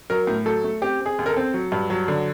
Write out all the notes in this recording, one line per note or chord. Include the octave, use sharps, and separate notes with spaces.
F#3 A#4
A2
F#3 A4
A3
C4 G4
C4
G#4
D#2
A#4
A4
C4
F#3
G2
F#3
D3